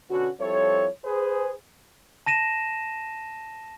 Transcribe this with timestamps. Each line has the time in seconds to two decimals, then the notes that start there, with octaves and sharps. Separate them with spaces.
0.10 B2 D3 B3 C#4 F#4
0.40 F3 G3 C4 E4 A4 C#5
1.05 G#4 B4 C5
2.26 A5 A#6 D#7 E7